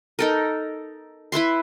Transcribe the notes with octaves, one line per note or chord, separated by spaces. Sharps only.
D#4 A4 A#4
E4 B4 E5 C6